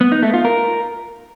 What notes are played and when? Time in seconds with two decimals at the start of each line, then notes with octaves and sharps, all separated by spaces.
0.01 B3
0.12 D#4
0.23 A3
0.34 F4
0.45 A#4